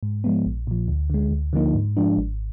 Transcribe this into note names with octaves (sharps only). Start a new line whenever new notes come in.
G#2
F3 G#3 B3
A#1
A#2 F3
D2
D3 G#3
D2
D3 F3 A#3 D#4
G#2
F3 G#3 D4
G#1